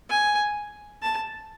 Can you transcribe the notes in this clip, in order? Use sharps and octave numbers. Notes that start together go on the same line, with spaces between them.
G#5
A5